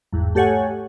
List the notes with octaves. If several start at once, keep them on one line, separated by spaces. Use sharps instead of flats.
G1 E2 G#2
A3 G4 A4 C#5 F#5 G#5